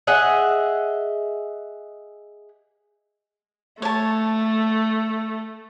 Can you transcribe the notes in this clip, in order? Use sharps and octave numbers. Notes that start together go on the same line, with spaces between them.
G#4 D#5 E5 F#5
A3 C#5 A5